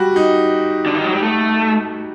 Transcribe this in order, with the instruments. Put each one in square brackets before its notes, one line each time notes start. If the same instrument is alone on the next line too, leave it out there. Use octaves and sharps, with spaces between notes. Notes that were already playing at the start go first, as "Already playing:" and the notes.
Already playing: [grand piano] G3 F#4
D#4
[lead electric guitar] D3
D#3
F#3
G3
A3